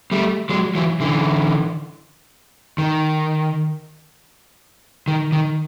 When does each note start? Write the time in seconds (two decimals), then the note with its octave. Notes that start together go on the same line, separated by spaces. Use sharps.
0.12 G3 A3
0.49 F#3 G#3
0.75 E3 F#3
1.00 D3 E3
2.78 D#3
5.08 D#3
5.32 D#3